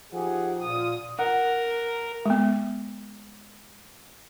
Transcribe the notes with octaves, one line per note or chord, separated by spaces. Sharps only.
F3 D#4 G4 G#4 F#5
A#2 F4 D#6
A#4 F#5
G#3 B3